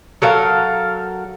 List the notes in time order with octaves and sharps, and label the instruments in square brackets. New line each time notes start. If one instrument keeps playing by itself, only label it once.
[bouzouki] F#3 A4 A#4 F5